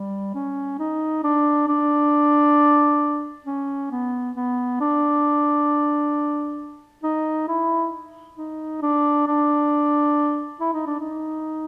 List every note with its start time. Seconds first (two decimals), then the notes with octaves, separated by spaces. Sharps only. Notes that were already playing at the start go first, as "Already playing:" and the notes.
Already playing: G3
0.34 C#4
0.79 D#4
1.24 D4
1.68 D4
3.46 C#4
3.91 B3
4.36 B3
4.81 D4
7.04 D#4
7.48 E4
8.38 D#4
8.82 D4
9.27 D4
10.61 E4
10.74 D#4
10.87 D4
11.00 D#4